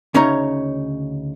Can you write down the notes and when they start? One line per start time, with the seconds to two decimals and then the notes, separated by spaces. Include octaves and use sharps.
0.14 D2 C#3 C#4 D#4 C#5 A#5